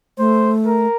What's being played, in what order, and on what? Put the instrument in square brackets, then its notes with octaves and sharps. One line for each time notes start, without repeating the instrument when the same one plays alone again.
[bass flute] A3 [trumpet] C5
[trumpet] A#4